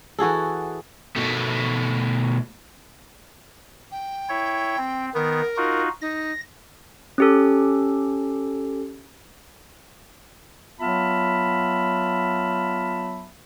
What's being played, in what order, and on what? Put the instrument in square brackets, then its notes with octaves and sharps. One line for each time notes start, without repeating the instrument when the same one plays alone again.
[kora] E3 F#4 G#4 A4
[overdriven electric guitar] B2 A3
[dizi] G5
[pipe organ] E4 C#5
C4
[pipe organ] D#3 B3 [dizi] A#4
[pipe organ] D#4 F4 F#4
[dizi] D#4 [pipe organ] A#6
[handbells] C#4 G4 A4
[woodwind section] F#3 B3 F4 E5 A5 B5